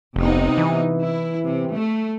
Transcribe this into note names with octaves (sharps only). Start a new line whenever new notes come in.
F1 C3 B3 D#4
E3
E4
C3
A3